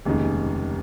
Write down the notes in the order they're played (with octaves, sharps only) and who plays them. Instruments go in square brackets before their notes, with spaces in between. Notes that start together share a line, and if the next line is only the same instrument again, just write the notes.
[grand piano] F1 D#2 C#3 G#3 D#4